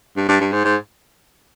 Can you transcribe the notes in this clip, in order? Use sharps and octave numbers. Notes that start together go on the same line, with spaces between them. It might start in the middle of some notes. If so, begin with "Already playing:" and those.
G2
G2
G2
G#2
G#2